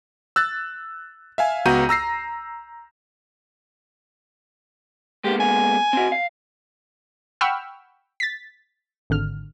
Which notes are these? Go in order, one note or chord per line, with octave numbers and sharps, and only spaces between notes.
E6 F#6 A6
E5 F5 G#5
C#2 B3 F#4 A#5 G6 D#7
A#5 E6 A#6 C7
G#3 A#3 B3 G4
G#5
C4 F#4
F5
F#5 G5 B5 C#6 E6 F6
A6 B6
G#1 D3 F6